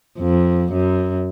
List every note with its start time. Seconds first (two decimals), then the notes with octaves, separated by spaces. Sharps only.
0.18 F2
0.72 F#2